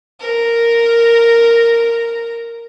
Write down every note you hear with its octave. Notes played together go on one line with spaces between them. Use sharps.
A#4 A#5